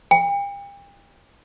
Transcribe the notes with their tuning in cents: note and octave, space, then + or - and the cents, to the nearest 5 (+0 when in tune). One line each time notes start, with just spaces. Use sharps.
G5 +40